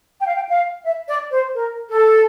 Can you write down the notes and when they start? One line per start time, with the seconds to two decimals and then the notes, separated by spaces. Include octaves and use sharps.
0.20 G5
0.27 F5
0.35 G5
0.49 F5
0.84 E5
1.08 D5
1.32 C5
1.54 A#4
1.90 A4